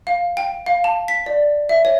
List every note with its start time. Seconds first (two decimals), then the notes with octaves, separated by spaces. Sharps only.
0.07 F5
0.37 G5
0.66 F5
0.84 A5
1.08 B6
1.26 D5
1.69 E5
1.85 C#5